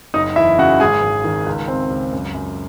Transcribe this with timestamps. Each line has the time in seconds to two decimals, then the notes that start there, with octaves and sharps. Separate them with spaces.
0.14 F#1 D#4 D#5
0.36 E2 E4 E5
0.58 C#3 F#4 F#5
0.80 G#1 G#4 G#5
1.02 G#1
1.24 D#3
1.46 C#2
1.68 C4
1.91 C#2
2.13 F#2
2.34 F#2